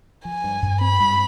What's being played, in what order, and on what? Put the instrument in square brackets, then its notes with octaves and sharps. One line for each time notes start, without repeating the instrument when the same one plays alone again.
[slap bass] F3 [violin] G#5
[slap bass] G2
G2
[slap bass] C4 [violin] B5
[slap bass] G2